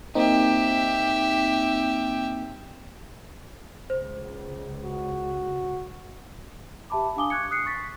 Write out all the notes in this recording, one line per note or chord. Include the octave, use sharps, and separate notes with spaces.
A#3 C4 D#4 G4 E5
C#2 C5
F#4
G4 E5 A5 B5 D6
D4 F5 G#5 D6 D#6 G7
C#6 D6 F#6 G#6 C#7
D#6 F#6 C7 C#7
C#6 A6 B6